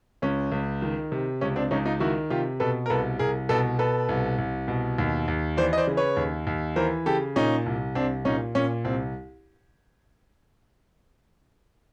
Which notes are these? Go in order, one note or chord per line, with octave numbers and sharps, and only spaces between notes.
C#2 C#4
C#2
D#3
C3
C#2 C#4
C4 D4
C#2 C#4 D#4
D#4 F4
D#3 E4 F#4
C3 F4 G4
B2 A4 B4
A#4
C2 A4 B4
C2 G#4 A#4
B2 A4 B4
B2 A4 B4
C2
C2
B2
D#2
D#2
E3 C5 D5
D#5
C5 D5
C#3
B4 C#5
D#2
D#2
E3 A#4 C5
C#3 G4 A4
A#2 C#4 D#4
C2
C2 C4 D4
A#2 C#4 D#4
A#2 C#4
C2 C4